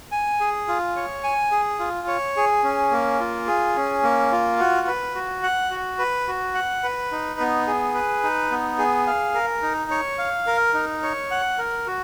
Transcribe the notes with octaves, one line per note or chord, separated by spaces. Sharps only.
G#5
G#4
F4
C#5
G#5
G#4
F4
C#5
G#4
C#4
A#3
F4
G#4
C#4
A#3
F4
F#4
B4
F#4
F#5
F#4
B4
F#4
F#5
B4
D#4
B3
G#4
B4
D#4
B3
G#4
F5
A#4
D#4
C#5
F5
A#4
D#4
C#5
F#5
A#4
F#4